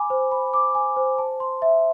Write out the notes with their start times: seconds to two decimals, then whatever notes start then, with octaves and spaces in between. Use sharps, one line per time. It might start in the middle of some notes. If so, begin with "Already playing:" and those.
Already playing: G#5 B5 D6
0.10 C5
0.31 B5
0.54 D6
0.75 G#5
0.96 C5
1.19 A5
1.40 C6
1.62 E5